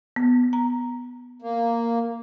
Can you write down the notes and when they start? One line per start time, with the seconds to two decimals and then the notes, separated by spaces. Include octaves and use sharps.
0.16 B3
0.53 A#5
1.42 A#3